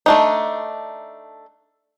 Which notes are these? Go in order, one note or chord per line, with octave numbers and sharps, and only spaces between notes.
A3 D4 D#4